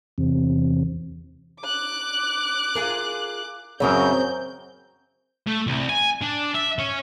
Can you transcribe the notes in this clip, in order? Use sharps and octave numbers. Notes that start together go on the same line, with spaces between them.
E2 C3
D6 F#6
F4 G#4 A#4
F#2 C#3 F#3 C4 A#4 G6
A3
C2
G#5
D4
E5
C#4